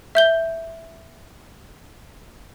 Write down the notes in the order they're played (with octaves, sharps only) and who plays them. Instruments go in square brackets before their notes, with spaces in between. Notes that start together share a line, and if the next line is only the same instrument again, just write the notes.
[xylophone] E5 G6 G7